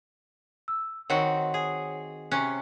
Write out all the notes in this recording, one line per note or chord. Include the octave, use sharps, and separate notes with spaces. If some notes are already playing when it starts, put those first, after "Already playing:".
E6
D#3 C4 F#4 C#5 F#5
G#4
C3 C#4 F#6